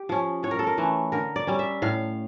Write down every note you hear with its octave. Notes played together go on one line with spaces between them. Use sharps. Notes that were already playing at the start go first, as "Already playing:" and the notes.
Already playing: G4
F3 C#4
A2 C#5
A#4
A4
A#4
E3 A3 C#4
D3 A#4
D5
G3 C#4
E5
A2 F5